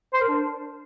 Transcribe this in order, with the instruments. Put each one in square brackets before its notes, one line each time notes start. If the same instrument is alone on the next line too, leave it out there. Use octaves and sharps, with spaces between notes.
[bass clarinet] C5
A#4
D4